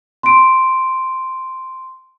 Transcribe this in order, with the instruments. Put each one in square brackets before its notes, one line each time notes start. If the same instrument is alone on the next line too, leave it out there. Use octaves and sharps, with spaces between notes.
[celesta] C6 D7